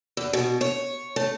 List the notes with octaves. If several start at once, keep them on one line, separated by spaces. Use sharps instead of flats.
E2
B2
C#5
A3